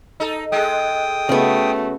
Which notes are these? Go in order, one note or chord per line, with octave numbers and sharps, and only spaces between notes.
D#4 A4
G#3 A4 G5 D#6
C#3 A3 B3 F#4